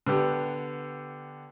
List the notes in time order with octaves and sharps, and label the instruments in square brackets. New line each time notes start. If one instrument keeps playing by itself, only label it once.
[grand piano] D3 B3 G4